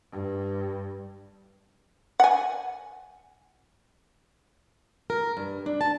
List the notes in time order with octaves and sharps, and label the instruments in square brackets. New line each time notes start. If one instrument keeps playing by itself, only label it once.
[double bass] G2
[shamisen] F#5 G#5
[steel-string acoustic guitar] A#4
G2
D4
A5